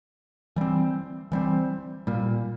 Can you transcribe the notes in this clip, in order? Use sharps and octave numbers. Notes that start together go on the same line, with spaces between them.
E3 G3 C4
E3 G3 C4
A#2 G3 A#3